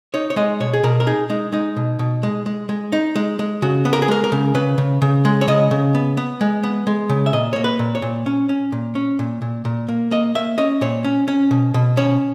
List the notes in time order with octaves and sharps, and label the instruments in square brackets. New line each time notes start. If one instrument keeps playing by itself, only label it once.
[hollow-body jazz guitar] D#4 C#5
C#5
G#3 D#5
B2 C#5
G#4
B2 A#4
A#4
D#4 G#4
G#3 D#4
G#3 D#4
B2
B2
G#3
G#3
G#3
D#4
G#3
G#3
C#3 F#4
B3
A#4
G#4
G#3 A#4
A#4
C#3
C#3 B4
C#3
C#3
G#3
C#5
C#3 D#5
C#3
B3
B3
G#3
B3
G#3
C#3
E5
A#2 D#5
A#3 C#5
B4
A#2
C#5
A#2
C#4
C#4
A#2
C#4
A#2
A#2
A#2
A#3
A#3 D#5
A#3 E5
C#4 D#5
A#2 C#5
C#4
C#4
B2
B2
C#4 C#5